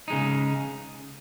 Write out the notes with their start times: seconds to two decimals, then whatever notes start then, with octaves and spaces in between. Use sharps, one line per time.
0.08 C#3 G#3 D#4